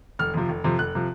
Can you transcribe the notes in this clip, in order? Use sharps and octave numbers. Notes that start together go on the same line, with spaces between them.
F1 F6
F2 C3 F3
F1
F2 C3 F3
F1 F#6
C3 F3